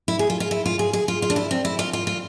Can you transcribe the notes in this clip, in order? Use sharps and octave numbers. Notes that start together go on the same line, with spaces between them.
E4
G#4
F4
F4
E4
F4
G#4
G#4
F4
F4
D4
E4
C4
E4
F4
F4
F4